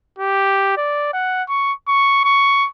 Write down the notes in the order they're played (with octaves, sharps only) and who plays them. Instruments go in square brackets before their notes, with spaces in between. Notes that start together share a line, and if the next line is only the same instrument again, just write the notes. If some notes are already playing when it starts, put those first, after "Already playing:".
[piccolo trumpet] G4
D5
F#5
C#6
C#6
C#6